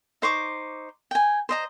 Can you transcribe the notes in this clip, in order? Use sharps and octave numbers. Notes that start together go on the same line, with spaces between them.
D#4 C5 C#6 D6
G5 G#5
C5 D#5 A#5